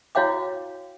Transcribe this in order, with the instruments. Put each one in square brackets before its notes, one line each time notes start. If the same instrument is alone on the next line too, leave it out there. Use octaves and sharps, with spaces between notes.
[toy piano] E4 F#4 C#5 F5 G5 D6